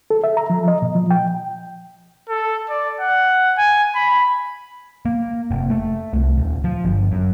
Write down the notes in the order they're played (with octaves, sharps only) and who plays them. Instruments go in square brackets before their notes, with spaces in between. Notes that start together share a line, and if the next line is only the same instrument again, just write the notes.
[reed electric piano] A4
E5
A#5
F3
D#5
A#2
F3
G5
[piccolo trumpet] A4
D5
F#5
G#5
B5
[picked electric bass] A#3
F1
A3
C2
D#1
F3
G1
F#2